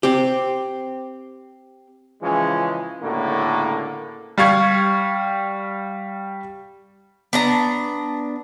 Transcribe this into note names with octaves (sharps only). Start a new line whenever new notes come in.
C4 G4
C#2 E3 F3 G#3 C#4
C#2 A2 D3 A#3 F#4
G3 F5 C#6 G#6
B3 D4 A#5